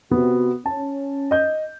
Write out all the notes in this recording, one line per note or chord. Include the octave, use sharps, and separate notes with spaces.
C3 B3 F#4
C#4 A5
D#5 G6